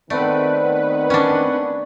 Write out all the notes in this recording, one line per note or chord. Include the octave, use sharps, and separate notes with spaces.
D#3 A3 B3 C4 B4 D5 F#5
C#4 D4